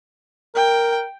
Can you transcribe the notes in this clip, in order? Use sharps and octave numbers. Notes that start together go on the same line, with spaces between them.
A#4 G5